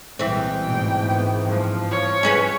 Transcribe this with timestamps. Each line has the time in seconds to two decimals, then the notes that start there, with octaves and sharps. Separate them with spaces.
0.19 C2 A#2 E3 G#3 C4 G5
0.64 A1 G#2 B2
1.06 G#1 G#3 B3
1.44 G2 F3
1.91 C#5
2.23 C#4 G#4 B4